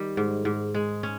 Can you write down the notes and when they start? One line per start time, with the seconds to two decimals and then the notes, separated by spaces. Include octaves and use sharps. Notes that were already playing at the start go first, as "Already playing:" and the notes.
Already playing: D#3 G3
0.17 G#2
0.45 G#2
0.75 G#3
1.03 C#4